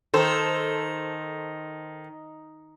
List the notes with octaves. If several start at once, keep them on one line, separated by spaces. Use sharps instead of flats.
D#3 A4 C5